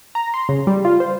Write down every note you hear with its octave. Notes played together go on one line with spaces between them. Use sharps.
A#5
C6
C#3
G3
F4
C5